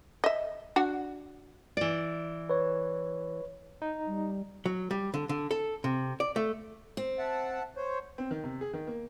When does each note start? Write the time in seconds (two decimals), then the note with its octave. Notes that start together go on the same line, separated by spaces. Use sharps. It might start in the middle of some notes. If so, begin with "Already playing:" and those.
0.24 D#5 E5
0.76 D4 F#4 F#5
1.77 E3 D5
2.49 B4 C#5
3.82 D#4
4.07 G3
4.66 F#3
4.91 G3
5.14 D3
5.29 D3
5.51 A4
5.84 C3
6.20 D5
6.36 A3
6.97 C4
7.19 E5 F#5 A5
7.77 C5 C#5
8.18 C4
8.31 D#3
8.44 C3
8.61 G#4
8.73 D#3
8.87 A#3